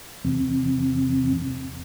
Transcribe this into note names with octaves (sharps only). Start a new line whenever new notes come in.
E2 C3